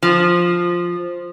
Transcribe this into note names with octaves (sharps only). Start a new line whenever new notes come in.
F3